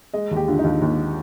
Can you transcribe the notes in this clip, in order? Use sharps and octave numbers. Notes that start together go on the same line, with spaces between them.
G#3 D#5
D#2
G4
D3 F4
D#4
D#2
D#2